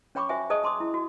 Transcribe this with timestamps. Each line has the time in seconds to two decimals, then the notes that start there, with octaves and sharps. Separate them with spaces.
0.15 C#4 C#5 G5 B5 C#6 D6
0.29 F#4 C5 E5 G5 G#5
0.50 G#4 C5 D#5 A5 D#6
0.64 A5 C6 D6 D#6
0.80 E4
0.94 F#4